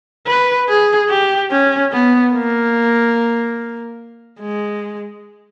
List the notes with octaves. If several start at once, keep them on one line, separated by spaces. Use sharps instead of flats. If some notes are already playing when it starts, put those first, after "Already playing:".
B4
G#4
G4
C#4
B3
A#3
G#3